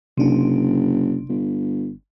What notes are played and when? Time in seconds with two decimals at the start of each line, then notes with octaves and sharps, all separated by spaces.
0.18 F#1 C3 D4
1.29 G1